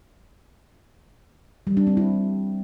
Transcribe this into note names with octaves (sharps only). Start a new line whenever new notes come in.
G3
D4
C4
E4